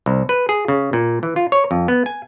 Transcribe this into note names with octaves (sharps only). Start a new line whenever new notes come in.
C2
B4
G#4
C#3
A#2
E3
F4
C#5
F2
B3
G#5